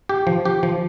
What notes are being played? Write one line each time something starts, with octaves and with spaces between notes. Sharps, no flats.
G4
F3
G4
F3